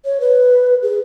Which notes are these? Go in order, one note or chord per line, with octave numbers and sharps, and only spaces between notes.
C#5
B4
G#4